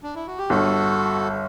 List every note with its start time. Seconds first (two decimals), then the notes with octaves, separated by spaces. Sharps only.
0.03 D4
0.15 E4
0.27 F#4
0.38 G4
0.49 G1 F#4 A4